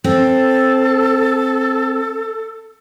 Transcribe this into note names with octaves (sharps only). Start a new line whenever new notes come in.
C4 A4